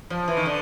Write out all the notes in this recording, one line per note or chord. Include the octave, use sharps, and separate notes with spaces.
F3
E3
D#3
D3